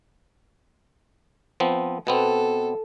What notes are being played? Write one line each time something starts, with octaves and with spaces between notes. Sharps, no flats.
F3 B3 C4
B2 B3 C4 A4